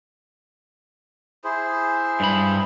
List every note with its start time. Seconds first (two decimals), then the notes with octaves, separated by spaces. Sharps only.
1.44 E4 G#4 C5
2.20 G2 B5